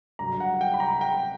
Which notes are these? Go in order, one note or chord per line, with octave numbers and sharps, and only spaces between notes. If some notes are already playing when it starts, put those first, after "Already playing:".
G2 D3 F#3 A#5
F#5
G5
B5
A#5
G5